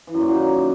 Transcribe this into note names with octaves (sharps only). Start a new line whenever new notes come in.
E3
F#2
A#2
F#3
D#3